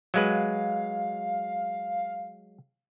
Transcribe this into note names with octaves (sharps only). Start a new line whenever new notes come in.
F#3 G#3 B4 F5